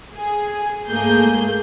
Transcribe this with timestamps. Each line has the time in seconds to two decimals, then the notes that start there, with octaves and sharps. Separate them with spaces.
0.14 G#4
0.89 G#2 A3 A#3 G#4 G6